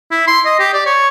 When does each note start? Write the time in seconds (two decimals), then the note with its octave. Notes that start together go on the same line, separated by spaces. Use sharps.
0.11 E4
0.27 C6
0.45 D#5
0.59 G4
0.73 D5
0.86 C#5